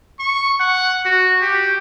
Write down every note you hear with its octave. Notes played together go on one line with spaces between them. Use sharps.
C#6
F#5
F#4
G4